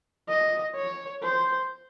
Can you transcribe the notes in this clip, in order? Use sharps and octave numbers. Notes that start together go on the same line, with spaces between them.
D#5
C#5
C5